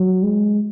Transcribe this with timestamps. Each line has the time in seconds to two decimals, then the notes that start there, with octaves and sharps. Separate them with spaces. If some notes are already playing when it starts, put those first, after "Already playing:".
Already playing: F#3
0.23 G#3